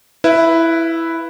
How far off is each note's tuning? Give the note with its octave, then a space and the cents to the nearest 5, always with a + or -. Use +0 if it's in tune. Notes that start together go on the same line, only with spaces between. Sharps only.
E4 +0 B4 +0 F5 -40